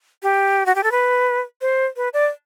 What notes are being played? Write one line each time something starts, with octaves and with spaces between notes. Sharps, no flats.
G4
F#4
G4
A4
B4
C5
B4
D5